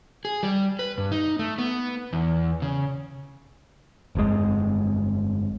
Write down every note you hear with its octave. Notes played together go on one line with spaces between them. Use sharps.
G#4
G3
B4
G2
D#4
A3
B3
E2
C#3
G1 F2 G#2 G#3